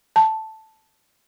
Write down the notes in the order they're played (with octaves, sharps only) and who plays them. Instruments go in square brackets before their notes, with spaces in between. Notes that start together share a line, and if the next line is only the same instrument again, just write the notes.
[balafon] A5